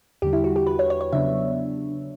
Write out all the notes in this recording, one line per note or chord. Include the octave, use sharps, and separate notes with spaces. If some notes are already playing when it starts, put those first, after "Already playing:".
E2 D3 G3 G4
E4
F#4
G4
B4
C#5
C#5
C#5
C#3 F#3 B3 D4 E5